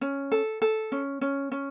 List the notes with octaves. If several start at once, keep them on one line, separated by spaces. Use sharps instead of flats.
C#4
A4
A4
C#4
C#4
C#4